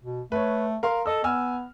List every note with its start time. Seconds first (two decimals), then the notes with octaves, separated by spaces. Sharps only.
0.04 B2
0.32 A3 B4 C#5
0.83 A#4 F5 C6
1.06 A4 D#5 E6
1.24 B3 G#5 E6 F6